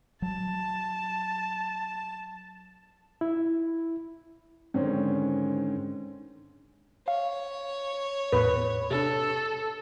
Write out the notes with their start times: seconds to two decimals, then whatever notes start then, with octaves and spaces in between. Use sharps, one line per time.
0.22 F#3 A5
3.21 E4
4.74 G#2 D3 D#3 C4 C#4
7.08 C#5 F5
8.33 E2 A2 B4
8.91 C3 D4 A4